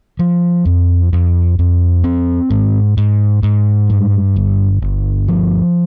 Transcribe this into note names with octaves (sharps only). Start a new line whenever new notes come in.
F3
F2
F2
F2
C4
G#2
G#2
G#2
G2
G1
G1
F3